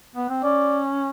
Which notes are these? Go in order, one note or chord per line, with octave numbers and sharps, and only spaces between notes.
B3
C4
C#4 D5